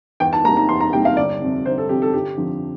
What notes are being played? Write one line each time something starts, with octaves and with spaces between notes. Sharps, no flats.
E2 G5
A5
C3 G3 A#3 A#5
A#5
E2 C6
A#5
C3 G3 A#3 G5
F5
G1 D5
F2 C3
G1 C5
A4
F2 C3 G4
A4
G1 G4
F2 D3 F3